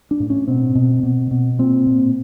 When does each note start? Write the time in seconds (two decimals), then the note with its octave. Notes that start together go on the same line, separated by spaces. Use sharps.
0.11 D4
0.20 A2
0.30 C#4
0.47 B2 C4
0.75 B2
1.03 B2
1.31 B2
1.59 A#2 C4
1.86 A#2